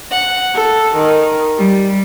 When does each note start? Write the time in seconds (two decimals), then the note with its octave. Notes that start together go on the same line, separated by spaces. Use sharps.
0.11 F#5
0.53 A4
0.93 D#3
1.58 G3